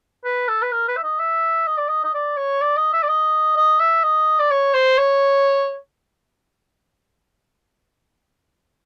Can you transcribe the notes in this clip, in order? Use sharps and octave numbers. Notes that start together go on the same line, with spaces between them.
B4
A4
B4
A#4
B4
E5
D#5
E5
D#5
D5
D#5
D#5
D5
C#5
D5
D#5
E5
D5
D#5
D#5
E5
D#5
D5
C#5
C5
C#5